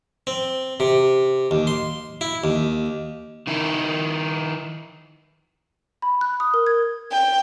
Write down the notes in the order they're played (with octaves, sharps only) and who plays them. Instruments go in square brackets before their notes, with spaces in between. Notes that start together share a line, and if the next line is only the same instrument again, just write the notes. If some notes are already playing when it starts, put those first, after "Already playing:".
[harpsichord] C4
C3
D#2
C6
E4
D#2
[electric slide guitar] D#3 D#4 E4
[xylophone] B5
F#6
D#6
A#4
G#6
[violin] G5